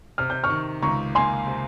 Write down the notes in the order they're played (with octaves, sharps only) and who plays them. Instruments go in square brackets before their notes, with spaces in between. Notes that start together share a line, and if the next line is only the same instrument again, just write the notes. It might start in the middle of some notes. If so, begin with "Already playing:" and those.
[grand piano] C3 [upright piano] F6
[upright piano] G6
C#6 F6
[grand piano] D#3
[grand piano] C#2 [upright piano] A#5 C#6
[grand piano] A#3 [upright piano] G#5 C6
[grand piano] C3